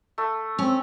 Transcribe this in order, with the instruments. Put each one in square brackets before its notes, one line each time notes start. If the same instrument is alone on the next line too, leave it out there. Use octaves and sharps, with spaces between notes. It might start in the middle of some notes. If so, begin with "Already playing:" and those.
[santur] A3
[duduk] C4 [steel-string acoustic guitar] C#4